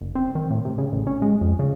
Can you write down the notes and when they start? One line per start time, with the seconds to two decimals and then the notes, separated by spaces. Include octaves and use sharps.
0.01 F#1
0.15 C4
0.35 D#3
0.50 A2
0.65 C3
0.78 C#3
0.93 A1
1.07 C#4
1.22 G#3
1.41 F2
1.59 C#3